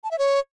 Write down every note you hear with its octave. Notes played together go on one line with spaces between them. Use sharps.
A5
E5
C#5